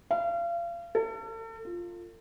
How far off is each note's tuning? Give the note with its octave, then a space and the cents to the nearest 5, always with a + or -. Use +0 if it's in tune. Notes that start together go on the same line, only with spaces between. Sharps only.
F5 -35
A4 +40
F4 +0